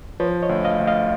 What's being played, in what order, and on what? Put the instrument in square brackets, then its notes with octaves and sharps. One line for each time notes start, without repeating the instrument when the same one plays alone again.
[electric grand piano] F3 [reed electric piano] B4 C#5
[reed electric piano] C#5 D#5
[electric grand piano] D2
[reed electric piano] D#5 F5
[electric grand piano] D2
[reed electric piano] D#5 F5